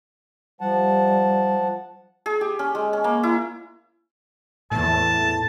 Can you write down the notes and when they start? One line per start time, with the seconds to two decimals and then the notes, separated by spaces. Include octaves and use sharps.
0.61 F3 G3 F#5 A5
2.26 G#4
2.41 G4
2.59 C#4
2.75 G#3
2.93 C#4
3.04 A#3
3.23 E4
4.72 E2 A2 A5